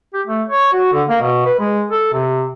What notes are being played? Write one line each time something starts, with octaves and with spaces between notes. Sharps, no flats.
G4
A3
C#5
F#4
D3
A#3
B2
B4
G#3
A4
C3